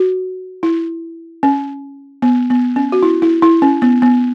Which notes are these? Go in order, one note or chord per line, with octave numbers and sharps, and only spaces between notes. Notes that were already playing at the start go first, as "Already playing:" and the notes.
Already playing: F#4
E4
C#4
B3
B3
C#4
F#4
E4
E4
E4
C#4
B3
B3